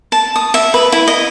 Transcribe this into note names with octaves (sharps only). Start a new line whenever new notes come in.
A5
D#6
E5
B4
E4
D#5